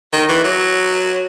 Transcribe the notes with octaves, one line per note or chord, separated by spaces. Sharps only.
D#3
E3
F#3